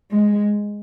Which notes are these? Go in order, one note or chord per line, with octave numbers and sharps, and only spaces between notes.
G#3